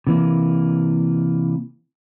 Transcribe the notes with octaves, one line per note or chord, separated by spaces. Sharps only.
C3 E3 A#3